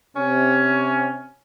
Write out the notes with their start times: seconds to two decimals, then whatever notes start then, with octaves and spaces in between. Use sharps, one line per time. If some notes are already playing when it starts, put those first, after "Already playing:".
0.16 C3 C#4